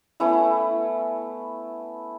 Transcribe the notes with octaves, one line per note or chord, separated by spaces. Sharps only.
A3 B3 C#4 E4